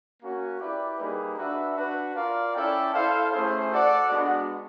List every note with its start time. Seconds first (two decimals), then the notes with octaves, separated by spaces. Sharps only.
0.21 A#3 C#4 F#4
0.59 E4 G4 B4 D5
0.99 G3 A#3 D#4 G#4 B4
1.37 D4 F#4 B4 E5
1.76 D4 F#4 B4
2.15 F4 A#4 D5 F5
2.54 C#4 E4 A4 D5 G5
2.93 E4 A4 C5 F5
3.32 A3 C#4 E4 G#4 C5
3.71 F#4 A4 D5 F#5
4.10 G#3 B3 D4 F#4